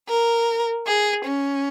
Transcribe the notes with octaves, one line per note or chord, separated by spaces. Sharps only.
A#4
G#4
C#4